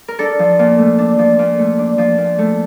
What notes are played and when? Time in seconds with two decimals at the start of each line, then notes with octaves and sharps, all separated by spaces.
0.08 A#4
0.19 D4 A4
0.39 F3
0.59 A#2
0.78 A3
0.98 D4
1.19 F3
1.39 A#2
1.58 A3
1.79 D4
1.98 F3
2.18 A#2
2.38 A3